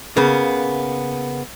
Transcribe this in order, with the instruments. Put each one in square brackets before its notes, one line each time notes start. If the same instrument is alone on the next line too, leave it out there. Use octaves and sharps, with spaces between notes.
[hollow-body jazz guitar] C#3 A#3 B3